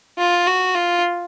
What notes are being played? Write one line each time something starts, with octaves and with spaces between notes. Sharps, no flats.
F4
F#4
F4